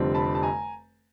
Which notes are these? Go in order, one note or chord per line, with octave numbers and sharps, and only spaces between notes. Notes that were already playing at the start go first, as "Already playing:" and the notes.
Already playing: F1 F2 D3 G3 C4
A5 B5
A5
G#5 A#5